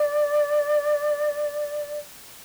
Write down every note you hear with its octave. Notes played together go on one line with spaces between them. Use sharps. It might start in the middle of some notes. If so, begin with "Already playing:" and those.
Already playing: D5